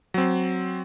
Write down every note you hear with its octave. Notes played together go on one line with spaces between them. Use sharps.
F#3 C4